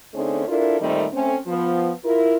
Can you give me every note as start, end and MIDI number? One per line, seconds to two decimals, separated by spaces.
0.14 0.43 50
0.14 0.43 57
0.14 0.43 60
0.14 0.43 61
0.14 0.43 63
0.14 0.43 68
0.48 0.78 62
0.48 0.78 64
0.48 0.78 65
0.48 0.78 69
0.48 0.78 70
0.81 1.05 46
0.81 1.05 51
0.81 1.05 55
0.81 1.05 57
0.81 1.05 60
1.13 1.36 57
1.13 1.36 60
1.13 1.36 61
1.46 1.92 53
1.46 1.92 59
2.04 2.37 64
2.04 2.37 65
2.04 2.37 70